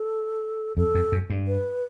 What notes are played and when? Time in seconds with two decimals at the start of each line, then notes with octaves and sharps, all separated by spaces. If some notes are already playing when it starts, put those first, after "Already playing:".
Already playing: A4
0.77 F2 A4
0.95 F2
1.12 F#2
1.30 G2
1.47 B4